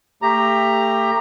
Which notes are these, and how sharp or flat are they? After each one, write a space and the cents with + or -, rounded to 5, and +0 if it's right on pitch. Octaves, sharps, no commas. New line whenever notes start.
A3 +35 G4 +20 A#5 +0